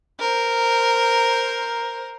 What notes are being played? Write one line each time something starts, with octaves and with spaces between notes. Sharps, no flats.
A#4 C5